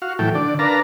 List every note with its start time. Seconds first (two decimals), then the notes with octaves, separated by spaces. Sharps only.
0.02 F#4 F5
0.19 A2 E3 F#3 A4 G5
0.35 D3 D5
0.59 D4 A#4 B4 F5 A5 A#5